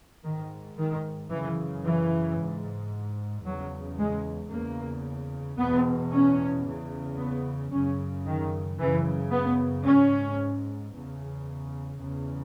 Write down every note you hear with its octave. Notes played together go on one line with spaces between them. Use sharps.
G#2 D#3
D#3
F#2 C#3 E3
E3
G#2
E2 C#3 F#3
G#3
E2 C#3 A#3
E2 B2 B3
C#4
E2 C#3
B3
F#2 C#3 C#4
D#3
F#2 C#3 E3
B3
G#2 C#4
E2 C#3
E2 C#3